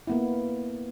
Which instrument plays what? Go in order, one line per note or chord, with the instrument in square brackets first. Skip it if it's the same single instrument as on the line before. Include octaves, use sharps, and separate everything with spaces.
[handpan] A#3 B3 E4